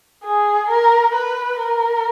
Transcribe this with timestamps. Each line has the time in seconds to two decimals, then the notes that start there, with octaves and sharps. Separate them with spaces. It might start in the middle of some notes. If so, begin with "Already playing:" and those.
0.24 G#4
0.69 A#4
1.15 B4
1.61 A#4